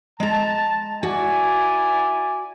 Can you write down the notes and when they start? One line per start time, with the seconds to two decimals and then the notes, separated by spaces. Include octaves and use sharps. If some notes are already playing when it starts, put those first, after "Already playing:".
0.20 G#3 A5 A#5
1.03 E4 F#4 D5 G#5